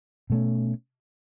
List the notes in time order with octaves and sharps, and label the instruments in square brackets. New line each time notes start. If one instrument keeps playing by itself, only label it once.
[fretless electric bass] B2 A3 C#4